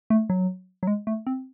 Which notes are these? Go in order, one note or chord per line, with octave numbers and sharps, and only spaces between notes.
A3
F#3
F#3
G#3
A3
C4